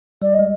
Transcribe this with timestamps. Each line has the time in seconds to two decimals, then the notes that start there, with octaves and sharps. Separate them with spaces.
0.22 G3 D5
0.34 D#5
0.39 G#3